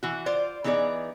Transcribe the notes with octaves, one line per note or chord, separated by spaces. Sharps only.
E3 F#4
F4 C5 D5
E3 B3 D#4 G#4 C5 D5